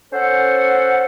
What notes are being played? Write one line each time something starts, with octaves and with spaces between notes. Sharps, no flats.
C#4 A4 C5 F#5